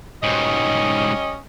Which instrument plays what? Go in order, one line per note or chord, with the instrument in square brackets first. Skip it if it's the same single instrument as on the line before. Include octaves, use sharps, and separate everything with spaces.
[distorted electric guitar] G#2 B2 [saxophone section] G3 C#4 D#5